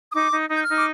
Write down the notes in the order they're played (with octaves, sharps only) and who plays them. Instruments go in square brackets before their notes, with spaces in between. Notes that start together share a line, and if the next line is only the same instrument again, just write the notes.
[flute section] D#6
D#4 D6
D#4
D#4 G6
F6
D#4
D6